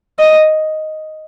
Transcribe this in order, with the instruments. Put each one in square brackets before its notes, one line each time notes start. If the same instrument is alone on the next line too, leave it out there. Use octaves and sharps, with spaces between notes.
[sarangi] D#5